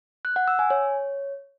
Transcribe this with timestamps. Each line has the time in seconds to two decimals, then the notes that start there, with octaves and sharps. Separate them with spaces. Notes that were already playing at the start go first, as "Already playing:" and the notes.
0.25 F#6
0.36 F#5
0.48 E6
0.59 G#5
0.70 C#5